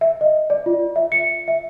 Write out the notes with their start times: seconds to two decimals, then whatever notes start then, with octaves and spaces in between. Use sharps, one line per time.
0.01 E5
0.21 D#5
0.50 D5
0.66 F4
0.96 E5
1.12 C#7
1.48 E5